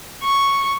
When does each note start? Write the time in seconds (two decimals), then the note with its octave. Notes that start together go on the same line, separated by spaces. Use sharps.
0.23 C#6